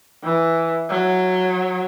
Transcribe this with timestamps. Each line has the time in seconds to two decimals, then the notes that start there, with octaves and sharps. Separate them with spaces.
0.23 E3
0.90 F#3